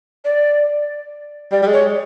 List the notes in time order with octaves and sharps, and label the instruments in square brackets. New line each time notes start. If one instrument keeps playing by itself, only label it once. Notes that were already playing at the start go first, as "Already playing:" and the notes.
[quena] D5
[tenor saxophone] G3 [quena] D5
[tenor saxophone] G3
G#3
[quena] C#5